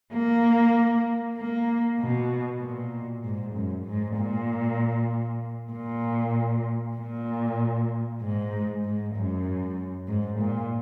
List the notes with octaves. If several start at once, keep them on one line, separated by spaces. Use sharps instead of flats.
A#3
A#3
B2
A#2
G#2
F#2
G#2
A#2
A#2
A#2
G#2
G#2
F#2
G#2
A#2